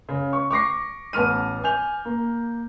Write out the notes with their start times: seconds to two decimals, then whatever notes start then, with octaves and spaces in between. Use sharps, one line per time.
0.09 C#3
0.33 C#6
0.51 C#6 D6 A#6 C7
1.13 A1 B3 A5 F6 D#7
1.64 G#5 G6 F7
2.05 A#3